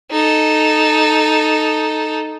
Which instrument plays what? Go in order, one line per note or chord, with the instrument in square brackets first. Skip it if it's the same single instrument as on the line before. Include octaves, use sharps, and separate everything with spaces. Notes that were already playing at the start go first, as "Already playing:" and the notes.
[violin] D#4 A4